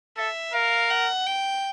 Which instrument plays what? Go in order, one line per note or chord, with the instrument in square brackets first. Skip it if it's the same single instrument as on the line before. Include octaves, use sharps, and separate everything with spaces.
[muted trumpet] A4 [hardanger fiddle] E5
[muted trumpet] A#4 [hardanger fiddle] F5
[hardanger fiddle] F#5
G5